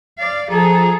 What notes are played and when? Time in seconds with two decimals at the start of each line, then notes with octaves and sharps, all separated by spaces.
0.19 D5 F5
0.50 F3 G#4 A4 A5 A#5